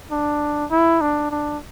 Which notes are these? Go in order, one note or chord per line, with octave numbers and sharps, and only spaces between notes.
D4
E4
D4
D4